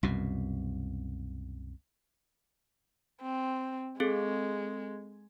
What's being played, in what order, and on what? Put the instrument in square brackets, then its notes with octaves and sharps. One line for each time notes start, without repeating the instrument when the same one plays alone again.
[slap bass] C2 F#2 B2
[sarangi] C4
[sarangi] G#3 [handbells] C4 G#4 A4